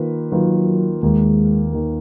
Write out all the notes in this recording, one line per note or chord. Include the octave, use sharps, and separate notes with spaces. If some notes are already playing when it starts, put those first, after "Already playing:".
Already playing: D#3 A#3 F4 B4
D#3 F#3 A#3 F4 B4
D#2 D#3 G#3 A#3
D#3 A#3